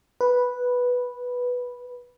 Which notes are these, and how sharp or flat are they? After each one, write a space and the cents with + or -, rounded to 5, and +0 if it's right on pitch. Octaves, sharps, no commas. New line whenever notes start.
B4 -5